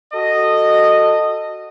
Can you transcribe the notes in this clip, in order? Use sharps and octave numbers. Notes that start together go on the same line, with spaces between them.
F#4 A4 D#5